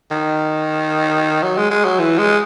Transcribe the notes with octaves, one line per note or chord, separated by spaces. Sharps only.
D#3
F#3
G#3
G#3
F#3
E3
G#3